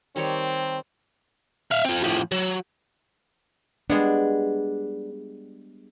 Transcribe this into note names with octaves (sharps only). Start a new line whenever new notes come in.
D#3 G3 C4 C#5
E5 F5
C4 F4
A2 F3
F#3
G3 G#3 B3 D4